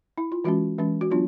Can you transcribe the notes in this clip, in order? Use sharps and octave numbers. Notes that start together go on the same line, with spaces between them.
E4
F4
E3 G#3 C#4 F#4
E3 G#3 C#4
F#4
F#3 B3 D4 F4